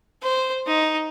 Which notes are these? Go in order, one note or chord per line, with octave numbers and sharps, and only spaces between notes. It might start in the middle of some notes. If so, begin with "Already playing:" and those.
C5
D#4